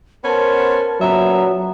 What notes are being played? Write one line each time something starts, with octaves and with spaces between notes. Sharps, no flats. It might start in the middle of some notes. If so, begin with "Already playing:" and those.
B3 C#4 A#4 C5 A5
A#2 C#3 F#3 B3 E5 A#5